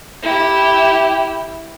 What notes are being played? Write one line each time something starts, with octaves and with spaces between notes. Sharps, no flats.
E4 G4